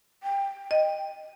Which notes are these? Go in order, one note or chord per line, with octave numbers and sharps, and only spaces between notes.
G5
D#5